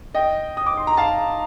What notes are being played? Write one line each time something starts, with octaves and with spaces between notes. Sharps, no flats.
D#5 G5
D#6
D6
C6
A#5
F5 A5